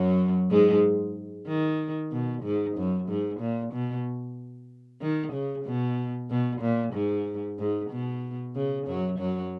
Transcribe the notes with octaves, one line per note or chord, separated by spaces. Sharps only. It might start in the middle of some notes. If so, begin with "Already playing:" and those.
Already playing: F#2 F#3
G#2 G#3
D#3
B2
G#2
F#2
G#2
A#2
B2
D#3
C#3
B2
B2
A#2
G#2
G#2
B2
C#3
F#2 F#3
F#2 F#3